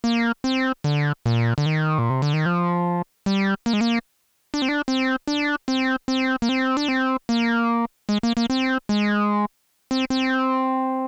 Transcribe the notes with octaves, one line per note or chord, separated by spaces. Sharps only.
A#3
C4
D3
A#2
D3
D#3
A#2
C3
D3
D#3
F3
G3
A#3
G#3
A#3
D4
C4
D4
C4
D4
C4
C4
A#3
C4
D4
C4
A#3
G#3
A#3
A#3
C4
G#3
C4
C4